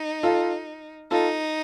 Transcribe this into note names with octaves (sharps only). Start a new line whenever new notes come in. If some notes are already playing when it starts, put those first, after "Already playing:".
Already playing: D#4
F4 A4
D#4 F4 A4